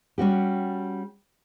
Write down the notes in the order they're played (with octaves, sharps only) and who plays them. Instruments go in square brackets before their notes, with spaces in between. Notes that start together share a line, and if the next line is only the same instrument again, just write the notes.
[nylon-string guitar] G3 C#4 F#4 G4